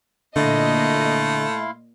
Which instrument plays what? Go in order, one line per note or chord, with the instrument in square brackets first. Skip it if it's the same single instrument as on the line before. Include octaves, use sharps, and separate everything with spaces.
[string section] A#2 D#5 [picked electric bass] D3 [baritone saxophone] A3 [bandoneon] E4 F5 C6